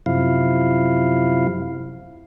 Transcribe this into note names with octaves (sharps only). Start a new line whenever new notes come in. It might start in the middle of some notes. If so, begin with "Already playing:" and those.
F#2 C3 F3 E4 F5